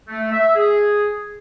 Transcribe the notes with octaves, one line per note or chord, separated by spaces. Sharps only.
A3
E5
G#4